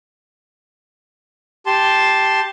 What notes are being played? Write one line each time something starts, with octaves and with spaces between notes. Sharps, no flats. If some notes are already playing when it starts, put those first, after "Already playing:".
G4 A5 C6